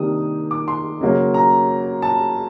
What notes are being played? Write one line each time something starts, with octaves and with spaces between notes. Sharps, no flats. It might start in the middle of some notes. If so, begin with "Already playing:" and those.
Already playing: C3 D#3 G3 A#3 D4 D#6
D6
C6
C#3 F#3 A#3
A#5
A5